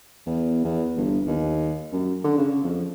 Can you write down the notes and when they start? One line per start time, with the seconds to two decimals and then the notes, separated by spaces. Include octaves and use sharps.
0.27 E2
0.64 E2
0.97 G1
1.27 D#2
1.93 F#2
2.24 D3
2.38 C#3
2.64 F2